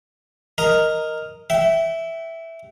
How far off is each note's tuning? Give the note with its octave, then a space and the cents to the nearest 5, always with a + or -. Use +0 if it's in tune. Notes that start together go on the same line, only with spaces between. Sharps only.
A#4 +0 D#5 +0 A#5 -10
E5 +0 G5 -40